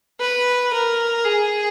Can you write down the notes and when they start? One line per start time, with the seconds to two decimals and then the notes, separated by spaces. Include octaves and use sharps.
0.20 B4
0.73 A#4
1.25 G#4